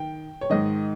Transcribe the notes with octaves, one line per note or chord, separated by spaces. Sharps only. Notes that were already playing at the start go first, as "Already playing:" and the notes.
Already playing: D#3 G5
C#5
G#2 D#3 D#5